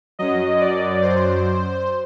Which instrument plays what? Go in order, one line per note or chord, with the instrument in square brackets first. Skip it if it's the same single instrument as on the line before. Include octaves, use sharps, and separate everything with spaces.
[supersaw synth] F#2 F#3 D#5
D5
C5